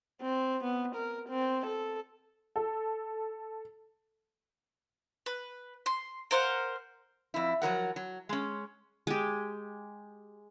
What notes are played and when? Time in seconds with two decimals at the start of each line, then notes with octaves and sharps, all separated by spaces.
0.22 C4
0.64 B3
0.96 A#4
1.29 C4
1.66 A4
2.56 A4
5.26 B4
5.86 C6
6.31 A#4 C5 F5 F#5
7.34 F2 E4
7.62 F3 F#3 A#4 F#5
7.96 F#3
8.29 G#3 C#4
9.07 G#3 G4